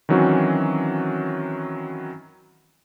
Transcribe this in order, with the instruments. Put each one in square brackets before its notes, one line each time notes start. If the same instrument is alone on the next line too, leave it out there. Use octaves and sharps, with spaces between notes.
[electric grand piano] D#3 E3 F#3 C4 C#4 F#4